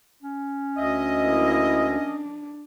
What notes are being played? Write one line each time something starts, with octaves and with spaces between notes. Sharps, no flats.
C#4
D2 D#5 E5
A#3 E4
D4